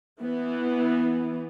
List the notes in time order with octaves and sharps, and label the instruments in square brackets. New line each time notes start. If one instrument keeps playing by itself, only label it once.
[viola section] E3 B3